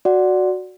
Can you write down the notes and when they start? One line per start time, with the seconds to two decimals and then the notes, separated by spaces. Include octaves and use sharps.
0.05 F#4 D5 F#5